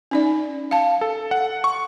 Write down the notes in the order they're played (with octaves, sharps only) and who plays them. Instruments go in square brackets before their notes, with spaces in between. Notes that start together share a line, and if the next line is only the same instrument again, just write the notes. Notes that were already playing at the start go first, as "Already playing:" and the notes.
[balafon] C#4 D#4 D5
F5 A5
[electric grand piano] A4
F#5
C#6